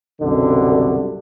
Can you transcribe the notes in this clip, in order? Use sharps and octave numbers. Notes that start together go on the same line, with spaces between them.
C2 F#2 B2 D3